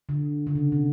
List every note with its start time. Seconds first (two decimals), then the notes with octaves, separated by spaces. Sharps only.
0.09 D3
0.47 D3
0.55 C#3
0.72 C3